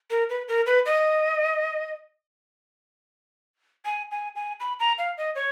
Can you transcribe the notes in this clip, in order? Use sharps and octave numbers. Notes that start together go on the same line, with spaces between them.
A#4
B4
A#4
B4
D#5
G#5
G#5
G#5
B5
A#5
F5
D#5
C#5